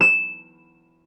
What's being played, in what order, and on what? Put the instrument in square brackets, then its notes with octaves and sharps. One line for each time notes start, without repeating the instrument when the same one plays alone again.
[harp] E7